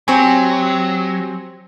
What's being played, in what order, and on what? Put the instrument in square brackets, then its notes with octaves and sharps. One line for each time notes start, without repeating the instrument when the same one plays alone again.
[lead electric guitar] F#3 [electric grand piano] C4 G#5 [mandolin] G4 C#5 A#5